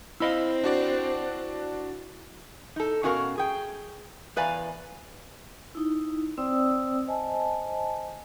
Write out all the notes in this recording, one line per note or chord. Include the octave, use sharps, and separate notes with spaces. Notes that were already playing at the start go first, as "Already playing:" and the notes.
C4 E4 D#5 F5 B5 E6
D4 F#4 D5
D#4 A4
B2 C#4 F#4 A#4 F5
G#4 G5
E2 B4 D5 F5 G#5 A#5
D#4 E4
C4 C5 D5 G5 D#6 E6
C5 D#5 G#5 A5